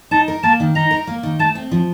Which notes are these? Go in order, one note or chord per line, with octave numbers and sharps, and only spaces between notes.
D#4 A5
A#4
A#3 A5
D#3
D#4 A#5
A#4
A#3
D#3
A3 A5
C4
F3